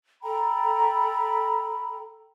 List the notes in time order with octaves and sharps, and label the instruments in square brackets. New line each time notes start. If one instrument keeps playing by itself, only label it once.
[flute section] A4 G5 A#5 B5